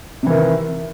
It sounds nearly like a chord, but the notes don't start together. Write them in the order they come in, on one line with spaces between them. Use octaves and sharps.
C3 E3 D#3